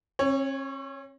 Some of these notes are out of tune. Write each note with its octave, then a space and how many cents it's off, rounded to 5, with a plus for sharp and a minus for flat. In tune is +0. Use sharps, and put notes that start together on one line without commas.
C#4 -45 C#5 +0